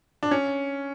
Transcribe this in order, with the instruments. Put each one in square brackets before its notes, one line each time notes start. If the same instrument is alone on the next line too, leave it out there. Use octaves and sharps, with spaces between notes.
[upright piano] D4
C#4